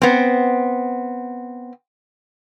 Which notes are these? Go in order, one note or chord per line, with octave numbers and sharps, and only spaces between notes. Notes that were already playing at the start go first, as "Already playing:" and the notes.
B3 C4